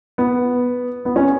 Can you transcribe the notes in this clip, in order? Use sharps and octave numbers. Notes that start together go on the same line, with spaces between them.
B3
B3
C#4